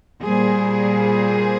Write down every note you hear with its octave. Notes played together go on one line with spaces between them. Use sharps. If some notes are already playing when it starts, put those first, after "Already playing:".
A#2 G3 A#3 G#4 C5